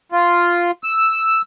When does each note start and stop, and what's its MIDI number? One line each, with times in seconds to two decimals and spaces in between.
0.12 0.71 65
0.83 1.42 88